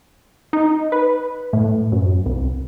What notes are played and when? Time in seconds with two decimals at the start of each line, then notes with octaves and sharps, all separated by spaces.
0.53 D#4
0.92 B4
1.53 A2
1.92 F#2
2.26 C2